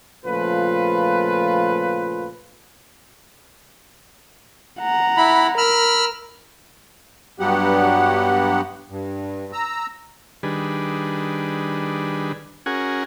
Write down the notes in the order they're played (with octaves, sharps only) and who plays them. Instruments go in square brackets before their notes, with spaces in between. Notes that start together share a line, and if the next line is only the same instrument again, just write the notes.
[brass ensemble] A#2 C#3 F3 A3 F4 B4
[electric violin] F#5 A#5
[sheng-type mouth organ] E4 B5
[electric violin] A#4 [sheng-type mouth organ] B5 E6 F6
[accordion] G2 F#3 B3 G4 F#5
G2
A#5 E6
[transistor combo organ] D#3 G3 D4 G#4 B4
C#4 F#4 G#4 A#4 F#5 G#5